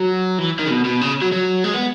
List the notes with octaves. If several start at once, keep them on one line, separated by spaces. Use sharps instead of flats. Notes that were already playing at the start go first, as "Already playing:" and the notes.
Already playing: F#3
E3
D#3
C#3
B2
B2
C#3
F#3
F#3
G#3
B3